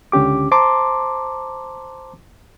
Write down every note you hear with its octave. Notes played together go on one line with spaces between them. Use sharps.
C#2 D3 C#4 G4 D6
C5 A5 A#5 C6 D6